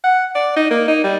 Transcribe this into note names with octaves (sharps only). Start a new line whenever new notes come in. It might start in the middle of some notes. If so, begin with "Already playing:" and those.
F#5
D5
D#4
A#3
D#4
G3